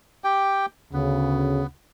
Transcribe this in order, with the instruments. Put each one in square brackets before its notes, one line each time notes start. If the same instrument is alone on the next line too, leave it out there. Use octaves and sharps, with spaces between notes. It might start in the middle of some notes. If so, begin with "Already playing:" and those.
[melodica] G4 G5
[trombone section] D2 C#3 [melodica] B3